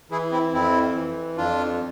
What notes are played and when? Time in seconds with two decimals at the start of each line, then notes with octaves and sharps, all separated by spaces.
0.11 E3 E4 G#4
0.31 C4 E4
0.52 F2 C4 E4
0.95 E3
1.37 F2 D4 F4